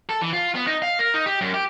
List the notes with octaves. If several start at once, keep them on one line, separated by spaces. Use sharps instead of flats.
A4
E3
F4
B3
D#4
F5
A#4
D#4
G4
F#2
G4